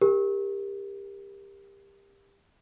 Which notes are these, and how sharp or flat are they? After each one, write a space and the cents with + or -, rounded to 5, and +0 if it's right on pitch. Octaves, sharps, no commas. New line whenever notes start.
G4 +25 A#4 +0